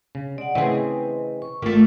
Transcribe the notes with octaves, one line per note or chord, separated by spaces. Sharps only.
C#3
G#3 D5 F#5
C#3 E3 A3 C4 G#4 B4 D#5
C#6
G#1 A3 A#3 F4